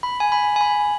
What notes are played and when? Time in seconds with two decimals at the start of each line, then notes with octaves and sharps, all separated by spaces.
0.03 B5
0.20 G#5
0.32 B5
0.56 G#5
0.61 B5